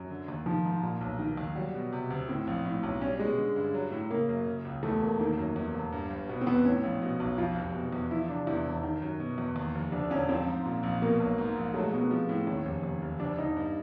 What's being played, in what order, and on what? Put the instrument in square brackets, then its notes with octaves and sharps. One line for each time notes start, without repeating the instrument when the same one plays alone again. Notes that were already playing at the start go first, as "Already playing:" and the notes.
Already playing: [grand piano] F#2
D3
D#2
[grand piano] D#3 [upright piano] F3
[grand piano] G#2
A#2
B1
D#3
D#2
[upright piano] F#3 [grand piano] G3
[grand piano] B2
C3
D2
[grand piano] A2 [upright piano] C4
[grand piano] A#1
A2
B1
[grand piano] G3 [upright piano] C#4
[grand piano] B2 [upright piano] G#3
[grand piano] D3
G2
F#3
A2
[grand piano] C#3 [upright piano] A#3
[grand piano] F#2
C#3
C#2
[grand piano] E2 [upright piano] A3
[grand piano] E1 [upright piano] A#3
[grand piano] D#3 [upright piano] A#3
[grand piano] F#2
E2
E1
G2
G1
[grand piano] B2 [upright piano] B3
[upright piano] C4
[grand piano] E2 [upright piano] B3
[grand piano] A2 [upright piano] C#4
[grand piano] A#1
B2
B1
[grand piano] F2 [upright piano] F4
[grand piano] F1
B2
E2
[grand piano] F3 [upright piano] E4
[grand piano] C3 [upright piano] D4
[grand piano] E2 [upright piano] E4
[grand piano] E1
D#3
F#2
B2
E2
D#2
F1
[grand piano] D2 [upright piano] D4
[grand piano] E1 [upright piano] C#4
[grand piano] F3 [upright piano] C4
[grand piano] G#2
A#2
A#1
[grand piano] B2 [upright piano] A#3
[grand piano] B1
G#2
A#1
[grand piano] F#3 [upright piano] A3
[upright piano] G#3
[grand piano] B2 [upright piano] B3
[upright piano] C4
[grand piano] F3
A2
[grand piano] D#2 [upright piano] C#4
[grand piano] F1
D#2
F1
[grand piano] D2 [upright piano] D4
[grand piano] E1 [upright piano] D#4
[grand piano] G2